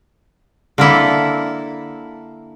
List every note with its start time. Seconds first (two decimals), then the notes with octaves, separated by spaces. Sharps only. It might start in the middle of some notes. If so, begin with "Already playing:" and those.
0.78 D3 A#3 E4 A4